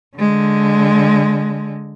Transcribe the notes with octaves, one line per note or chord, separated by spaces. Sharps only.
D3 G#3